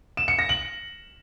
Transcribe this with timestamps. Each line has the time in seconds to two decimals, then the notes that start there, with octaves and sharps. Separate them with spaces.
0.17 E7
0.28 C#7
0.39 A#6
0.49 F#7